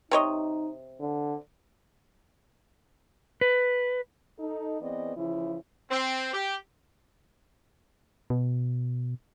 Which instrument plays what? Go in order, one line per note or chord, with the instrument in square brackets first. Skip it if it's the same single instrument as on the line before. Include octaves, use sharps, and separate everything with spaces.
[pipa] C3 C#5 D#5 [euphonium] D#4
[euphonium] D3
[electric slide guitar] B4
[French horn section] D#4 A4
E3 B3 C4 G#4 D5 D#5
C#3 E3 F3 E4
[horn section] C4
G4
[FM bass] B2